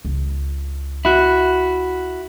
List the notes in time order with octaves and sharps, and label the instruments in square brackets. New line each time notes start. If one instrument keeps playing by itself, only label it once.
[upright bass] C#2
[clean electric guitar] E4 F#4